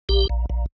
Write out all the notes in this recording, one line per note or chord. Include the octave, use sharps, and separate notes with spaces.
A#1 G4
A#1
A#1